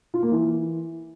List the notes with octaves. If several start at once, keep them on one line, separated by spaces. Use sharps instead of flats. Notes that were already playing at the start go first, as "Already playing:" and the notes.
F4
A#3
E3